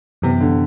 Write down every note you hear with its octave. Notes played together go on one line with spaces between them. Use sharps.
F#2 C3 E3 B3
D3